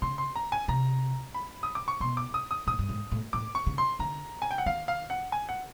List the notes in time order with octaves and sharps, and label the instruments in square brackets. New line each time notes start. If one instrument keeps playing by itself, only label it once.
[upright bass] C#3 [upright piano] C6
[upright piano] C6
A#5
G#5
[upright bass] C3 [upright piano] A#5
[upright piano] B5
D#6
D6
C#6
[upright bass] B2 [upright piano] C6
[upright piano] D6
D#6
D#6
[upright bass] A2 [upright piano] D#6
[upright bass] G2
G#2
A2
[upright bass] A2 [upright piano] D6
[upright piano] C#6
[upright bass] C#3
[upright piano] C6
[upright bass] D3 [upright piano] A#5
[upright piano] G#5
G5
F#5
[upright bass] D#3 [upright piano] F5
[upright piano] F5
F#5
G#5
F#5